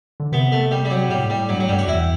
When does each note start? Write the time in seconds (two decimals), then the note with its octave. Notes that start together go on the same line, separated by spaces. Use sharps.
0.20 D3
0.32 C3 B3
0.52 A3
0.71 G3
0.85 G3
0.90 F#3
1.09 A2 G3
1.30 A2 G3
1.49 G2 F#3
1.60 A2 F#3
1.69 G2 G3
1.79 F#4
1.87 E2 E4